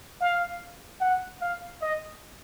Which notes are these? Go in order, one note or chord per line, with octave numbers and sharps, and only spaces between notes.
F5
F#5
F5
D#5